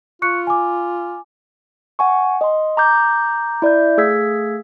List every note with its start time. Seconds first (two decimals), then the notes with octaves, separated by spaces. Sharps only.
0.22 F4 C#6 F#6 C#7
0.47 G#5 D6
1.99 F#5 G#5 C#6
2.41 D#5 C6
2.77 A#5 D6 G6
3.62 E4 D5 E5 G6
3.97 A3 G#4 F5 E6 G#6 B6